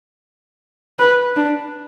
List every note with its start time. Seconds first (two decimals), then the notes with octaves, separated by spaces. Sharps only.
0.99 B4
1.36 D4